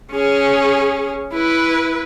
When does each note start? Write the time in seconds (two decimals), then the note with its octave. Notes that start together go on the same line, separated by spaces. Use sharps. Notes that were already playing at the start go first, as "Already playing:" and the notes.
0.12 C#4 G#4
1.33 E4 B4